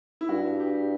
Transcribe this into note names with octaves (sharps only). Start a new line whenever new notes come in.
E4
G2 F#4
G4